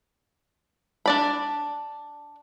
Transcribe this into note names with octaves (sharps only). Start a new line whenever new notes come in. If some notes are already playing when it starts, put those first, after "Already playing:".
D4 D5 B5